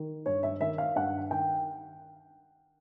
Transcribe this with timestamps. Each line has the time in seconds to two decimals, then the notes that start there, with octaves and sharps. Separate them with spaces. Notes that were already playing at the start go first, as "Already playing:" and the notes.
Already playing: D#3
0.26 G2 C#5
0.43 E5
0.61 D#3 E5
0.78 F5
0.96 G2 F#5
1.31 D#3 G5